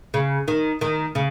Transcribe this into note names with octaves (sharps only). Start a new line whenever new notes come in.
C#3
D#3
D#3
C#3